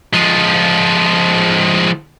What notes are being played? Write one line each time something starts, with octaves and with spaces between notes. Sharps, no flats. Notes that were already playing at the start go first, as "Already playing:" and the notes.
F3 G#3